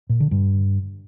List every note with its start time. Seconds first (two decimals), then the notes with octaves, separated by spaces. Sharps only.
0.09 A#2
0.20 D3
0.31 G2